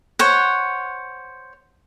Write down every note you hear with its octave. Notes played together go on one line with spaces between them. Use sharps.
C5 C#5 F#5